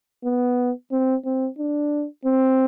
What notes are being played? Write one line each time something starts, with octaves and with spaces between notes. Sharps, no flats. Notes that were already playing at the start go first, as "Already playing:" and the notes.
B3
C4
C4
D4
C4